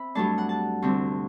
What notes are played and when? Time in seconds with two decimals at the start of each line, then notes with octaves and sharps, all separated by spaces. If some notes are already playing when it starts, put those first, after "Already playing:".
Already playing: C4 E5 B5
0.15 G2 F#3 A3 D4 A5
0.38 F#5
0.49 A5
0.82 D2 C3 G3 C4